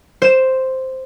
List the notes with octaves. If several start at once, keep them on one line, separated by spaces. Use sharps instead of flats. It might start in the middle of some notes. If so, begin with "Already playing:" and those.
C5 E7